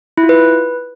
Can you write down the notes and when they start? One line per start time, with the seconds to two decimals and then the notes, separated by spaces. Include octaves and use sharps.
0.18 E4
0.23 F4
0.29 B4